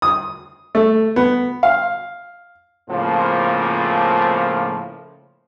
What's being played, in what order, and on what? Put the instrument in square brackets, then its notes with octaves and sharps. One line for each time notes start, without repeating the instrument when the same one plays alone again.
[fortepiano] D#6
A3
B3
F5
[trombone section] A2 C#3 F3 A#3 C4 F4